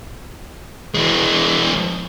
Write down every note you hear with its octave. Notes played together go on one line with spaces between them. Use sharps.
E3 G#3